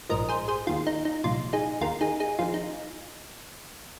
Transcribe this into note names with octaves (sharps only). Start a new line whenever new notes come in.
A#1 G#2 F3 A#4 D#5
G#4 C5
G#4 C5
D#2 D#3 F4
D#4
D#4
C2 A#2 F3 F4
D#4 G#4
D#2 D#3 F4 A#4
D#4 G#4
D#4 G#4
F2 D#3 F4
D#4